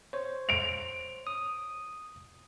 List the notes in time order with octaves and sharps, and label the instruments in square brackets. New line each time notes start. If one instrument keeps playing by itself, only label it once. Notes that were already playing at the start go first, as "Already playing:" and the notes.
[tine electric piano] C5 C#5
[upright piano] D7 F7
[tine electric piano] D#6